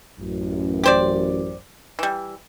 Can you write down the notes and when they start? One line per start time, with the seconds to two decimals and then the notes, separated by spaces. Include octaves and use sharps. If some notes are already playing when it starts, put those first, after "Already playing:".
0.18 A1 F#2
0.84 G4 C5 D5
1.99 E3 G3